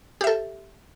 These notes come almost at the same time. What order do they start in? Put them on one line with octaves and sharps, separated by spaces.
G4 E5 A4